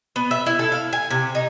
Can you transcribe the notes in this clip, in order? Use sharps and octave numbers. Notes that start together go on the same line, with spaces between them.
B3
E5
E4
A4
F5
G#5
C3
D#4